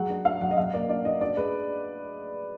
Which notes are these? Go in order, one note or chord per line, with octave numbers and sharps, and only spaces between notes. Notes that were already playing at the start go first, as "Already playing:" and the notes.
Already playing: F#3 G#3 F#5
D4
D4 F5
F#3 F#5
D#5
F#3 F5
A#3 D5
D4 D5
D4 D#5
D4 D5
G#3 B4